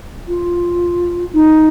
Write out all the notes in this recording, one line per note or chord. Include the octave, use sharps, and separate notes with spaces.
F4
D#4